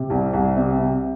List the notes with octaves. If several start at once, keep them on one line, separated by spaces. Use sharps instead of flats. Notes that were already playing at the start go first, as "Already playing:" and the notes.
Already playing: C3
C2
C2
C3
C3